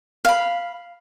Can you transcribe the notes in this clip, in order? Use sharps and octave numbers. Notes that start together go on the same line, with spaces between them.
F5 B5